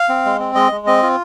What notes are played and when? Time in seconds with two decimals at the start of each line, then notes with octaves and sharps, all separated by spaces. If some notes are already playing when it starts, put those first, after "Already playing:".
Already playing: F5
0.09 C4
0.25 G#3
0.39 C4
0.55 G#3 D#5
0.72 G#3
0.87 C4 D#5
1.03 F4